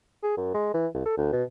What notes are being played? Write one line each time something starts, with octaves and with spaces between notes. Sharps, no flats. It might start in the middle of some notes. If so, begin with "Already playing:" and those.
G#4
F#2
G#3
E3
C2
A4
D2
B2